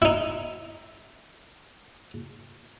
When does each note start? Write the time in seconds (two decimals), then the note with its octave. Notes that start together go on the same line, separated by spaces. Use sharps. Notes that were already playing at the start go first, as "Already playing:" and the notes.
0.02 D#4 E4